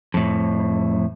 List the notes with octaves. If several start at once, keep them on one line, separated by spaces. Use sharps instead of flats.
F2 A2